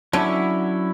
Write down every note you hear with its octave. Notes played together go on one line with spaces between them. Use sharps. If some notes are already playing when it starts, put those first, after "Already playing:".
D3 F#3 C#4 E4